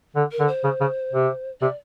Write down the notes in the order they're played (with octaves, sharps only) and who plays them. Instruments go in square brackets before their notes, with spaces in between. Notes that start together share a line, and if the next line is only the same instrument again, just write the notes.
[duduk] D3
[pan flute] A#4
[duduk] D3
[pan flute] C5
[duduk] C#3
C#3
C3
[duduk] C3 [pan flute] D5